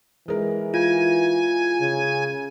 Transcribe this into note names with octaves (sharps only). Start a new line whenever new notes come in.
E3 G#3 A#4
F4 G#5 G#6
C#3